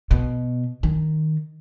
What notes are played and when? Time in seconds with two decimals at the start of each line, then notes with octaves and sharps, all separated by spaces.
0.11 B2
0.83 D#3